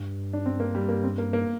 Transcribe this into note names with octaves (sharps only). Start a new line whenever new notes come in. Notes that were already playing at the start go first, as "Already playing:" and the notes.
Already playing: G2
D4
C4
A#3
G3
A#3
C4
A#3
A#3